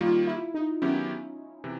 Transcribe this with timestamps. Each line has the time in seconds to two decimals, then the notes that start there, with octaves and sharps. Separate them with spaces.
0.01 D#3 G3 A#3 F4
0.27 E4
0.54 D#4
0.82 D#3 F#3 B3 C#4 E4 G4
1.64 C3 E3